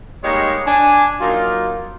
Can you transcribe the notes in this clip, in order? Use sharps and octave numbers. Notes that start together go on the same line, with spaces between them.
G3 G#3 A#3 D#4 C#5
D4 G#5
F#3 A#3 D#4 F4